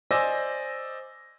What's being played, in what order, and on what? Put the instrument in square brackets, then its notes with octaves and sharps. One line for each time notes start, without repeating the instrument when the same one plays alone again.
[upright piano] C5 D5 D#5 G#5 E6 A#6